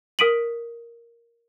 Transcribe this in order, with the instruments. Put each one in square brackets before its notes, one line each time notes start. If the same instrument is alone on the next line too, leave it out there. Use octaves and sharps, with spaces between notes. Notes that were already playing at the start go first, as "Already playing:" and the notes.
[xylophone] A#4 D#6 B6 D7 D#7 F#7